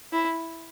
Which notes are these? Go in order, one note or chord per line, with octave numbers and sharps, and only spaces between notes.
E4